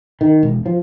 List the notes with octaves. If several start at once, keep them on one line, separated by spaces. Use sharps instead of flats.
D#3
E1
F3